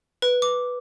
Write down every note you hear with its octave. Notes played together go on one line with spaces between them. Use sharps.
B4
D6